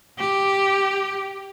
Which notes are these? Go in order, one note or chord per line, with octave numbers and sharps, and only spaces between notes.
G4